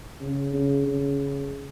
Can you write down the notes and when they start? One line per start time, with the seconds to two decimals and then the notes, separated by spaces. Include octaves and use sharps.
0.21 C#3
0.54 C#3
0.87 C#3